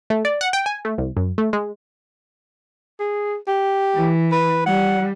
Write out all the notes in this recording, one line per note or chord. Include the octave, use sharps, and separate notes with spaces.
A3
D5
F#5
G5
G#5
A3
C2
F#2
A3
G#3
G#4
G4
E3
B4
G3 F#5